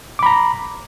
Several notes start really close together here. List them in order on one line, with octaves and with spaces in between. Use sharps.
D6 B5 A#5